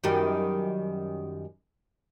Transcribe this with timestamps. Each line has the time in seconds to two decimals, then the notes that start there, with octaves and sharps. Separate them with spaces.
0.04 F#2 D#3 G3